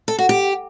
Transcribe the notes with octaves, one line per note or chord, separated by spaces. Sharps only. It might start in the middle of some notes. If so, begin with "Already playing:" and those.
A4
F#4
G4